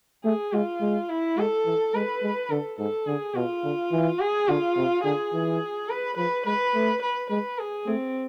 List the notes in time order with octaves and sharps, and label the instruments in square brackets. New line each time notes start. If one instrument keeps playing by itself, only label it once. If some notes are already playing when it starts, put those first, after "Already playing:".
[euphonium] A3 [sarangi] G#4
[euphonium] G#3 [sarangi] F4
[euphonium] G#3
[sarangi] E4
[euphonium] G#3 [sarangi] A4
[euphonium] E3
[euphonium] G#3 [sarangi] B4
[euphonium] G#3
[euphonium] D3 [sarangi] A4
[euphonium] G#2 [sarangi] A4
[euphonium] D3 [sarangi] G#4
[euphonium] B2 [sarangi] F4
[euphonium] D3
E3
[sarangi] G#4
[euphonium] D3 [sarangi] F4
[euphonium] C3
[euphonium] D3 [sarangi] G#4
[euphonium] E3
[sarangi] B4
[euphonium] F3 [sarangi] B4
[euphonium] G#3 [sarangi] B4
[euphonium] A3
[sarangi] B4
[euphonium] G#3 [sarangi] B4
[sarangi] G#4
[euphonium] A3 [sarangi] C4